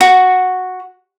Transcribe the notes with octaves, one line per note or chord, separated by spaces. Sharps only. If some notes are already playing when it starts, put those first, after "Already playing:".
F#4